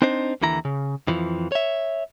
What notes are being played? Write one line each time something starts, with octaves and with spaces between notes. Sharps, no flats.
C4 D4 D#4 C5
D#2 D3 E3 E4 A#5
C#3
F2 E3 F3
C#5 E5